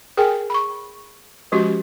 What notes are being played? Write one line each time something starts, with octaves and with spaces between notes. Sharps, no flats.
G#4 A#4 G5 G#5
B5 C#6
F3 G#3 C#4 F#4 G4